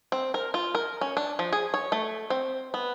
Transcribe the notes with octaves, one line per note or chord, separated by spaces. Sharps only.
C4
A#4
F4
A#4
C#4
D4
F3
G#4
C#5
A3
C4
B3